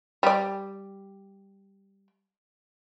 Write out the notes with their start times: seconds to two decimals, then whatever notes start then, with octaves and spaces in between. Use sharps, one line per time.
0.23 G3 D5